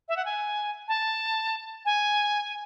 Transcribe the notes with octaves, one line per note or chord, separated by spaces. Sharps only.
E5
F#5
G#5
A5
G#5